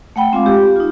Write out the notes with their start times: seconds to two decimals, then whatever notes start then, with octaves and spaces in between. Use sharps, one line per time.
0.16 A3 F#5 G5 B5
0.32 G#3 C4 F4 F5 D6
0.46 G4
0.76 D#4 F4